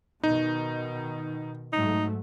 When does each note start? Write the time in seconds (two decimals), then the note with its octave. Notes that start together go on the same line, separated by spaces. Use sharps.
0.23 B2 D#3 D#4
1.73 G#2 F#3 A3 D#4